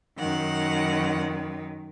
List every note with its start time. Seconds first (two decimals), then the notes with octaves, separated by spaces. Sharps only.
0.18 F#2 D#3 F#5